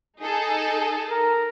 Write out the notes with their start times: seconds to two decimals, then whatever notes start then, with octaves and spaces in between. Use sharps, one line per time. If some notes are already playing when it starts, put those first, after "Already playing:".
0.19 D#4 G#4 A4
1.10 A#4